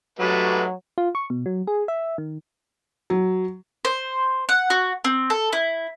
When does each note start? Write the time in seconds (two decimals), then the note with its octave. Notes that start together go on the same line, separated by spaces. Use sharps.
0.19 G#2 F#3 A3 G4 B4
0.98 F4
1.15 C#6
1.30 B2
1.46 F#3
1.67 G#4
1.88 E5
2.18 D#3
3.10 F#3
3.85 C5
4.49 F#5
4.70 F#4
5.04 C4
5.30 A4
5.53 E4